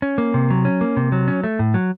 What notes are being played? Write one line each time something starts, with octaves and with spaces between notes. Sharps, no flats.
C#4
A#3
C3
F#3
C#4
A#3
C3
F#3
C#4
A3
A2
F#3